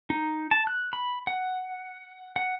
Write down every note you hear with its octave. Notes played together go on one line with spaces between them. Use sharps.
D#4
A5
F#6
B5
F#5
F#5